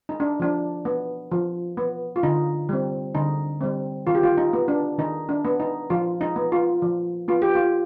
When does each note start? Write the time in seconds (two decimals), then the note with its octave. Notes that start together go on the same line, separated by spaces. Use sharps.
0.09 D#4
0.20 D4
0.40 F3 D4
0.85 B3
1.31 F3
1.77 B3
2.16 F4
2.23 D3 D#4
2.69 G3 C4
3.15 D3 D#4
3.61 G3 C4
4.07 D#3 F4
4.15 G4
4.23 F4
4.37 D#4
4.53 B3
4.68 D4
4.99 D#3 D#4
5.29 D4
5.45 B3
5.60 D#4
5.90 F3 F4
6.21 D#4
6.36 B3
6.52 F4
6.82 F3
7.28 B3 F4
7.42 G4
7.55 F4